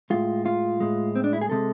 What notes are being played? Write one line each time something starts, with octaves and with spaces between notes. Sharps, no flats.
A2 G#3 F4
F4
A2 G#3
C4
D4
E4
G#4
C3 G#3 A4